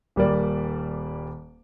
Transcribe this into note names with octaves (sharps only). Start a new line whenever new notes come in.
D#1 G3 A#3 D5